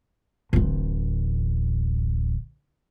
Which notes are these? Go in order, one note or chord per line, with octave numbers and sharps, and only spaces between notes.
D1 A1